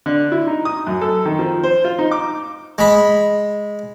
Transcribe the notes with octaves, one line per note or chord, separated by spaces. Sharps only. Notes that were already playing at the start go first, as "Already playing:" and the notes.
D3
E4
D#4
D#6
F#2
A4
D#3
F3
C5
F4
D#4
D6
G#3 B5